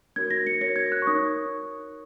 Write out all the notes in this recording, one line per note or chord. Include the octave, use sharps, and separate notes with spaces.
F#4 A#4 C#5 G#6
A#6
C#7
F#4 A#4 C#5 A#6
G#6
F#6
C#6
D#4 A#4 C#5 D#6